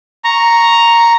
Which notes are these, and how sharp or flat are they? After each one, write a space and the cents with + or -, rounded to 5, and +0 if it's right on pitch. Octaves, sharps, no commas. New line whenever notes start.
A#5 +0 C#6 +0